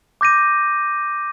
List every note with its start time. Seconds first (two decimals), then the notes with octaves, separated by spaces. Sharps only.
0.21 D6 G6 A#6 D#7